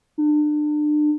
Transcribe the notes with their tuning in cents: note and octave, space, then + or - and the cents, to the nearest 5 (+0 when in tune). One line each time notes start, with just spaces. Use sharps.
D4 +35